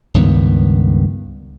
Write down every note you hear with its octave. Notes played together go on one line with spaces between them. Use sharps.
C#2 G2 D#3 B3